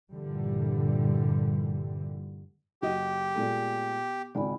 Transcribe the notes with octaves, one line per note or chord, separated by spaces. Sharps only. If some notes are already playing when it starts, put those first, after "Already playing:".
G2 A#2 D3 E3 G3
F#1 F#4 G4 D#5
A#2 G#3 A3 B3
G#1 C#2 G#2 D5 G#5 B5